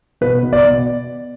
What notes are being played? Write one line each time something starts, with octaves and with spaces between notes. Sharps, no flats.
B2 B4
B2
D5
B2